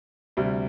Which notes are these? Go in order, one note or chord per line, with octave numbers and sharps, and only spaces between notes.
D2 C3 G3